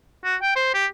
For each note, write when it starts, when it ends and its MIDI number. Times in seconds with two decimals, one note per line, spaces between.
0.24 0.36 66
0.42 0.52 79
0.56 0.69 72
0.74 0.86 67